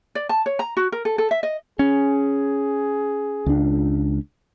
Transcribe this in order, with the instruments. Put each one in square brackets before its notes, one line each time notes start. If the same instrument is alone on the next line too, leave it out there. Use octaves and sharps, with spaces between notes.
[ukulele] D5
A5
C#5
A#5
F#4
A#4
A4
A4
E5
D#5
[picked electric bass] C#4 [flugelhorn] G#4
[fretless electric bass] C#2 D4